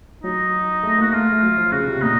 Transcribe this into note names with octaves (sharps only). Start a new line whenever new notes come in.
F#3 D#4
A3
A#3 F#4
A3 F4
A3
F#3
F3
C#3 F#4
C3
A#2 D#4